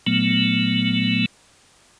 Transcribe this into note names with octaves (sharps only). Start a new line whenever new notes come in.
A#2 F#3 A3 B3